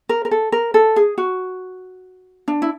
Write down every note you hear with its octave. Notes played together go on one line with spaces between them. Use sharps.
A#4
A#4
A4
A#4
A4
G#4
F#4
D4
E4